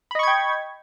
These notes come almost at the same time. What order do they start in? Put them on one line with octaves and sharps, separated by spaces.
B5 D#5 C#6 G#6 G5